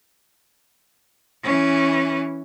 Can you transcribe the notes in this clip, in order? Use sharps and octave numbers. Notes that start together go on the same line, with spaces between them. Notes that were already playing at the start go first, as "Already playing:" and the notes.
E3 C#4